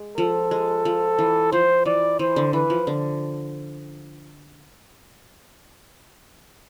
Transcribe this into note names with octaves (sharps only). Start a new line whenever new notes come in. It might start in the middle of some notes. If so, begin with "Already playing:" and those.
Already playing: G#3
F3 A4
G#3
F3
E3
F3 C5
E3 D5
E3 C5
D3
E3 B4
F3
D3